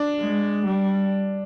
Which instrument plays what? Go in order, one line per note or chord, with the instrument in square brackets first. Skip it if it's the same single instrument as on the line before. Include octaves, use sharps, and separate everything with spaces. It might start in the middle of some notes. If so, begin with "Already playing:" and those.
Already playing: [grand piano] D4
[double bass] G#3
G3